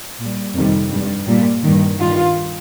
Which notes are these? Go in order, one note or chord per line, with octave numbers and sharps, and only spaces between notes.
A#2 G3
F2 C3 D#3 G3
G2 G3
A#2 G3
G2 D#3 G3
G2 D#3 G3 F4